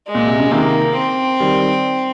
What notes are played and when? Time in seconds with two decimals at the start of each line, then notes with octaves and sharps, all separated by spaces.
0.08 G#3
0.15 A#2
0.26 C3
0.39 C#3
0.51 C3 D#3 A#3
0.95 C4
1.40 D#3 G3